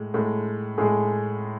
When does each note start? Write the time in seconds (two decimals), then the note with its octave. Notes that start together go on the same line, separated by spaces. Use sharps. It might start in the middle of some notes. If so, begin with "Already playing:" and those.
Already playing: A2 G#3
0.14 A2 G#3
0.78 A2 G#3 G#4